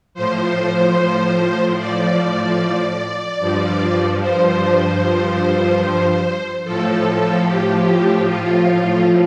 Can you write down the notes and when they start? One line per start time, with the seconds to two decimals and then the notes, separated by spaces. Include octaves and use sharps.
0.14 A2 F3 C5
1.77 D5
3.39 G2 F3
4.20 C5
6.64 A2 F3 A4
7.45 G4
8.26 F4